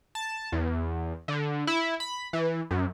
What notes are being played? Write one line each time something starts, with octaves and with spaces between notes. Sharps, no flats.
A5
E2
D3
E4
B5
E3
F#2